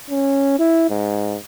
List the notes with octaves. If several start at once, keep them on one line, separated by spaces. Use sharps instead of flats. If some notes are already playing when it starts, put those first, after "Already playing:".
C#4
E4
G#2